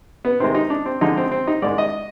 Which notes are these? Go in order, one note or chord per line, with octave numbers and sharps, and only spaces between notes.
B3
C3 D#3 G#3 C4
D#4
D4
C4
F2 D3 F3 G#3 D#4
C4
C4
D#4
G#2 D#3 G#3 D5
D#5